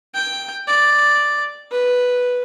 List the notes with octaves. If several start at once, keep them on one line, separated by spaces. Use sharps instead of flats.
G5
D5
B4